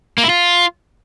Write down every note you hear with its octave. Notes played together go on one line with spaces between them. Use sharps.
A#3
E4
F4